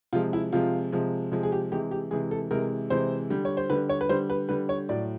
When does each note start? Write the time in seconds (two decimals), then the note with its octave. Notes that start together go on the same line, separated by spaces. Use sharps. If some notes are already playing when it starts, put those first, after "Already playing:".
0.13 C3 F3 G#3 F4
0.33 E4
0.52 C3 F3 G#3 F4
0.92 C3 F3 G#3
1.32 C3 F3 G#3
1.43 G#4
1.52 G4
1.72 C3 E3 G#3 G4
1.91 G4
2.11 C3 E3 G#3 G#4
2.31 A4
2.51 C3 E3 G#3 A#4
2.90 C3 E3 G#3 C5
3.30 D3 G3
3.45 C#5
3.57 C5
3.70 D3 G3 B4
3.89 C#5
4.01 B4
4.09 D3 G3 C5
4.30 B4
4.49 D3 G3 B4
4.69 C#5
4.89 A2 F#3 D5